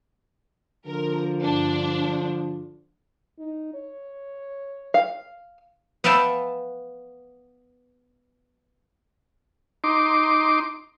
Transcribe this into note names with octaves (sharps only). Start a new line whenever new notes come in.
D3 F3 A#4
G2 D4
D#4
C#5
F5
B3 E5 F5 G5 A5
D#4 C6 D6